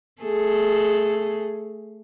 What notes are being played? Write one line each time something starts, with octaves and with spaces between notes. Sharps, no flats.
A3 G#4 A4